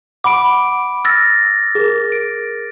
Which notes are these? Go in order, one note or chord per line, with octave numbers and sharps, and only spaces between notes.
F#5 B5 D6 D7
E6 F6 A6 A#6
G#4 A#4
D7